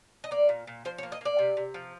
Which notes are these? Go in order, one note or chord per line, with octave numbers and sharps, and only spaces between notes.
D#5
A#3 D5
A#2
A#2
F3 C5
C#5
A#3
D#5
A#3 D5
C3
C3
F3